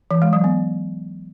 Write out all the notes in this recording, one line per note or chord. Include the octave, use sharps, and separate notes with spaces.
E3
G#3
F#3
B3